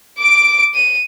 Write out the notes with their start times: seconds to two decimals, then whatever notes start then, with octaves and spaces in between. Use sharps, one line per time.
0.19 D6 D7
0.74 D#7